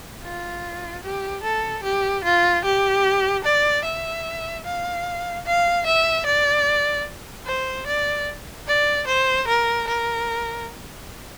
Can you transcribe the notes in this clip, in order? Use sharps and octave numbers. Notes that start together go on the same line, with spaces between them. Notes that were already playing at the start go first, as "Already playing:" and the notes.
F4
G4
A4
G4
F4
G4
D5
E5
F5
F5
E5
D5
C5
D5
D5
C5
A#4
A#4